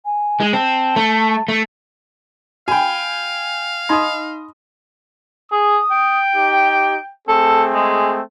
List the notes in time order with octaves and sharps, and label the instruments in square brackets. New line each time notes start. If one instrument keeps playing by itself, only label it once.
[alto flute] G#5
[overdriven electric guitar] G#3
[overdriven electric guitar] C4 [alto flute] A5
[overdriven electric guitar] A3
A3
[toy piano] F#4 B5 [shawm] F5 [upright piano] G5 G#5
[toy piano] D#4 B5 C6 [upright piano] D#5 D#6
[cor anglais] G#4 [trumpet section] D#6
[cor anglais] G5
[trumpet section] D#4 G4
[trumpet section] A3 C4 G#4 [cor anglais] A4
[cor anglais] G#3